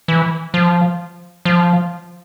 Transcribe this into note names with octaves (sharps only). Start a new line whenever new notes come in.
E3
F3
F3